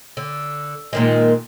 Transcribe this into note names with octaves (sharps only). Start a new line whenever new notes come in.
D3
A#2 D#3 G#3